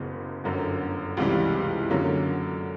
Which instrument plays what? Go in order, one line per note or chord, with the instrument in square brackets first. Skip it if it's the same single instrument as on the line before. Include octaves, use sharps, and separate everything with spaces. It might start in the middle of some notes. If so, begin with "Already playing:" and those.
Already playing: [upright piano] F#1 F#2 C#3 F#3 B3
G1 F#2 D3
C#2 C3 E3 G3
F#2 D3 F#3 A#3 C#4